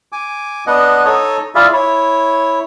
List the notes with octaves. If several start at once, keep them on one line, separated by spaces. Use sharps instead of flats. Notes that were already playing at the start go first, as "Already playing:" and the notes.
G#5 D6
B3 D4 D#5 F#5
D#4 A4 C#5 D#5
E4 F4 G#4 D5 E5 F5
E4 C#5